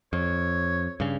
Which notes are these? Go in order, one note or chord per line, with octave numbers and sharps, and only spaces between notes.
F2 C#5
G2 C#3